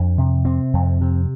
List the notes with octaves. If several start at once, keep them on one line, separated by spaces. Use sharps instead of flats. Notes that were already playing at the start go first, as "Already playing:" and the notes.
Already playing: F2 D4
C3
C3 C4
F2
C3